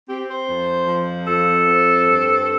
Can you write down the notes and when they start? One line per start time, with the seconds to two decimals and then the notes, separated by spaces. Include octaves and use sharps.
0.09 C4 G4
0.29 C5
0.48 F2
0.88 F3
1.27 F2 A4
1.66 C4
2.06 G2